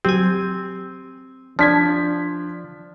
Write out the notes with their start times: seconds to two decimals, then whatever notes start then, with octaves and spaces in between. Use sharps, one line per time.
0.05 F#3 C4 G4 G#5
1.59 F3 D4 A5 G#6 B6